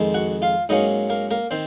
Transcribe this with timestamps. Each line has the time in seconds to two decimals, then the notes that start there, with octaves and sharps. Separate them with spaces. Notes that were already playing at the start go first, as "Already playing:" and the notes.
Already playing: F2 D#3 G#3
0.14 F#4 F#5
0.42 F4 F5
0.69 G#2 F#3 A#3 C#4 D#4 D#5
1.10 A#3 A#4
1.31 A#3 A#4
1.51 D#3 C4 C5